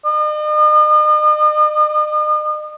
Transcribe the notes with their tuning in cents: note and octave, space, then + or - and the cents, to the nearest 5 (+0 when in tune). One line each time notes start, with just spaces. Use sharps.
D#5 -45